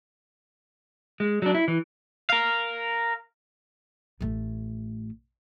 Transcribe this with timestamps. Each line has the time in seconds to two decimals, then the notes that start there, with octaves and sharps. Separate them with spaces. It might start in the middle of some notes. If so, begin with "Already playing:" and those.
1.20 G#3
1.42 F#3 D4
1.55 E4
1.68 E3
2.30 A#4 F5
4.21 A1 A3